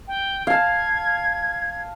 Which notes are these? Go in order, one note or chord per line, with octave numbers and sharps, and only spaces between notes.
G5
F5 A5 G#6